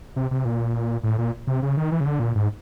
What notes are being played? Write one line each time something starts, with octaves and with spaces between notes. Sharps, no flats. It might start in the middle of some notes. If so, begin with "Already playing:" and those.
C3
C3
A#2
A2
A#2
C3
C#3
D#3
E3
C#3
D3
A#2
G#2